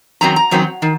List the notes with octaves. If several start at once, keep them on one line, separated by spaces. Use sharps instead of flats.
F#2 D#3 F#3 C4 A#5
A#5
F#2 D#3 F#3 C4
D#3